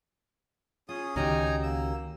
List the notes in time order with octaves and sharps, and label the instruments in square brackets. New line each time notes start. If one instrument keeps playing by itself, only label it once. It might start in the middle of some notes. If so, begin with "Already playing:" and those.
[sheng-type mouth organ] C#4 G#4 D#6 [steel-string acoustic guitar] F4
[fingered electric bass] C#2 D#3 [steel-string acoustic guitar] C#4 F#4 G4 [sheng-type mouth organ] D#4 G#5 A#5
[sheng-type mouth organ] A#3 E6